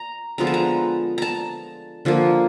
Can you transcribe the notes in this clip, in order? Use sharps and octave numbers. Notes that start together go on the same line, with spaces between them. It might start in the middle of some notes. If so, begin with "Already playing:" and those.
Already playing: A#5
D3 F3 G#3 B3 A#5
A5
A#5
A5 A#5
D3 F3 A#3